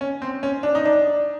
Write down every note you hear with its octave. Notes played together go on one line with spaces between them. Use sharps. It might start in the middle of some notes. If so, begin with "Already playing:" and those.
C#4
C4
C#4
D4
D#4
D4